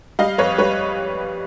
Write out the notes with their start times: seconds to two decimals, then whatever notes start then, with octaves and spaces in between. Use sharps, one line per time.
0.19 G3 D#5 F5
0.38 F2 B4 C#5
0.58 G3 B4 C#5